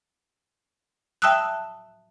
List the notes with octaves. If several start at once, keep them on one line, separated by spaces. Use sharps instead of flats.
E5 G5 A5 D#6 E6 F#6